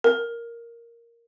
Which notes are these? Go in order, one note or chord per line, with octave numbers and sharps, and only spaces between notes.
A#4